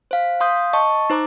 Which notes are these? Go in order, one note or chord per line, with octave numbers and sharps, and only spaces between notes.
C5 F5
F5 C6 D#6 G6
D#5 A5 C#6
D#4 C5 A#5 D6